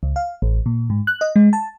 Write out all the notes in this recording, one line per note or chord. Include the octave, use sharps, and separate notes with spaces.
C#2
F5
A1
A#2
G#2
F#6
D#5
G#3
A5